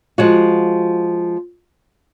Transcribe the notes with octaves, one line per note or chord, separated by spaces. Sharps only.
F3 G#3 F#4